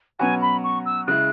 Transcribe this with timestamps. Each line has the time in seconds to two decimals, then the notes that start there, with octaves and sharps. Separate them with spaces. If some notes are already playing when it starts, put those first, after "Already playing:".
0.19 B2 F#3 C#4 F#4 B4 G#5
0.41 B5
0.63 C#6
0.85 E6
1.07 C#3 G#3 E4 F#6